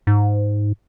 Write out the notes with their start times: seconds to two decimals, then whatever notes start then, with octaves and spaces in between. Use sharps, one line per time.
0.07 G#2